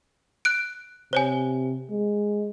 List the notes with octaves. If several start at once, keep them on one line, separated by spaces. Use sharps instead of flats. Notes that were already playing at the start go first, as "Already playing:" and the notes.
F#6 D7
C3 C5 C#5 G#5
G#3